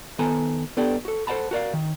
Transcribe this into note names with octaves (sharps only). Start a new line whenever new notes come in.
D#3 B3 A4 G#5 A#5
B3 D4 G4 A4 D5 G5
F#4 A4
A4 C5 D#5 F#5 A5 B5
F#4 A#4 D5 F5
D#3